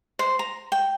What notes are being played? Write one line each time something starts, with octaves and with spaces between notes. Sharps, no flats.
C5
A#5
G5